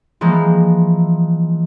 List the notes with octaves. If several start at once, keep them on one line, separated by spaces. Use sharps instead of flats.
E3 F3 G#3 A#3